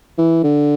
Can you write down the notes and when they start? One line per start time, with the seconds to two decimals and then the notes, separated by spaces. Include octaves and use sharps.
0.18 E3
0.44 D3